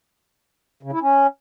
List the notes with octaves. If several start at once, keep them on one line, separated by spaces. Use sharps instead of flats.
C#3
E4
C#4